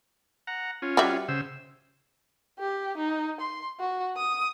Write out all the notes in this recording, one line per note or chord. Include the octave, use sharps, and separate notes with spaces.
F#5 A#5
C#4 F4
G3 F#4 E5
C#3 C5 E6
G4
D#4
C6
F#4
D#6